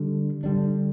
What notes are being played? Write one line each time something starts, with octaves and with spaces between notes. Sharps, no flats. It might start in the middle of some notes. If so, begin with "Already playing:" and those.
Already playing: D3 G3 D4
D3 G3 D4